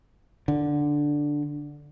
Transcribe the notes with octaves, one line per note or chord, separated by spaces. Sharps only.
D3